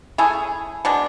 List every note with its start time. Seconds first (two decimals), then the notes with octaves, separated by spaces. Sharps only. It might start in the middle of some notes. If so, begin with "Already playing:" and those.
0.18 A3 C#4 E4 G#4
0.85 B2 G#3 D4